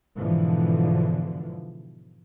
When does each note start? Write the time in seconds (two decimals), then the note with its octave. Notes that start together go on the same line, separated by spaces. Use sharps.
0.16 G#2 B2 D3 E3 F3